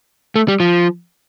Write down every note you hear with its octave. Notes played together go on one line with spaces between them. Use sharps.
A3
G3
F3